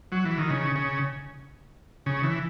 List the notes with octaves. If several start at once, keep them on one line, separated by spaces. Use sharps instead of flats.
F#3
E3
D#3
C#3
C#3
C#3
E3